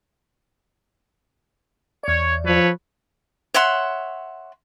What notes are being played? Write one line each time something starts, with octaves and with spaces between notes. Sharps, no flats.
E2 C#5 D5
F3 A4 B4 C#5
C#5 E5 F#5 C6